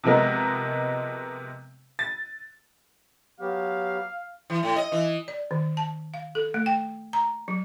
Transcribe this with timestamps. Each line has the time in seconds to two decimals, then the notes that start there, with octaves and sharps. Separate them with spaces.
0.04 C3 F3 G#3 B3 A#4
1.99 A6
3.40 F#3 B3 G4 F5
4.50 E3
4.63 A2
4.76 D#5
4.92 E3
5.28 D5
5.51 D#3
5.77 A5
6.14 F5
6.35 A4
6.54 A3
6.66 G5
7.13 A#5
7.48 F#3